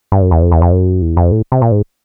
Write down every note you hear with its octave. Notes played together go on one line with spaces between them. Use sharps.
G2
F#2
E2
F2
E2
F2
F#2
E2
F2
A2
C3
A#2
G#2